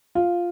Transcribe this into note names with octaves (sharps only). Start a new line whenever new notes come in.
F4